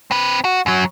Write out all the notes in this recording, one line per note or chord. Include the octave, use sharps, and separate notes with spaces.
C4 B4
F#4
F#2 F#3